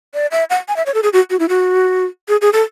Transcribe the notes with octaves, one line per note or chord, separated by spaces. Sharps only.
D5
E5
F#5
G#5
E5
C#5
A4
G#4
F#4
F#4
E4
F#4
G#4
G#4
A4